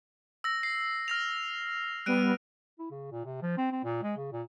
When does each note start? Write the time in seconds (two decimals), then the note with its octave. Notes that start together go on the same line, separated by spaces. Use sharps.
0.44 E6 A#6
0.63 C7
1.08 F6 A#6 F7
2.06 G3 B3 F#6 D7 D#7
2.78 E4
2.91 C#3
3.12 A#2
3.25 C3
3.42 F3
3.57 C4
3.72 C4
3.84 A#2
4.02 G#3
4.17 C#3
4.32 A#2